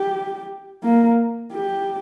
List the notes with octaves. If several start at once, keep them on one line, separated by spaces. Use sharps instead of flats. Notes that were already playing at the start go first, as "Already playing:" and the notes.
Already playing: G4
A#3
G4